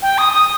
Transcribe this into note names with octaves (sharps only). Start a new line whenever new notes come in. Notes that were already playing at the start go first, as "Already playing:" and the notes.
G5
D#6
D#6